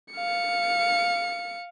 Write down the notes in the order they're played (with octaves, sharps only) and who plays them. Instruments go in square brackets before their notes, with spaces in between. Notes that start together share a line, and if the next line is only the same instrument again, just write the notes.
[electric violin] F5 C#7